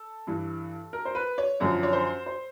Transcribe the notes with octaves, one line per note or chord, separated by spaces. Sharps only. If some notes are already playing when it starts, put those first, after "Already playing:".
Already playing: A4
G2 E3
A#4
C5
B4
C#5
F#2 D3 F3 C#5
C#5
C5
C5